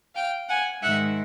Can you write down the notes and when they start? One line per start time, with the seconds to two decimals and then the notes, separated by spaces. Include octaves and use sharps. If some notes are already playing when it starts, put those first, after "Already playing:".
0.15 F5 G5
0.49 F#5 G#5
0.82 G#2 D#3 G#3 E5 F#5